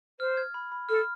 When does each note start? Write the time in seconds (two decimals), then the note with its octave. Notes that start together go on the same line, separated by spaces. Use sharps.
0.19 C5 F6
0.37 G#6
0.54 B5
0.72 B5
0.89 A4 F6